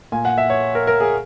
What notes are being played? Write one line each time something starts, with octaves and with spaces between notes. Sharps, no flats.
A#2 G#5
F#5
E5
C#5
A#4
A#4
G#4